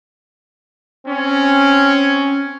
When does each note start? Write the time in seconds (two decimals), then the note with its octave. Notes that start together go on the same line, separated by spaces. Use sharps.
1.07 C4 C#4